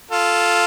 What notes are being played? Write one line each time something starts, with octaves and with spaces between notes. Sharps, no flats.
F4 A4